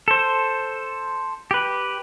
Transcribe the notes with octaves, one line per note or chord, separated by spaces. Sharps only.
A4 C5
G4 B4